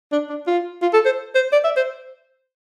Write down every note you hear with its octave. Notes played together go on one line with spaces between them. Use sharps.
D4
D4
F4
F4
A4
C5
C5
D5
E5
C5